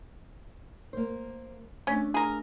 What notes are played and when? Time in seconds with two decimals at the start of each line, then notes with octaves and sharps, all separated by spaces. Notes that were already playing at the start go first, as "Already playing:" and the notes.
0.93 A#3 C5
1.87 A3 C#4 D4
2.14 G#4 A#4